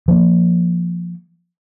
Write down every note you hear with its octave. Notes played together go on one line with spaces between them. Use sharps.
F3 A#3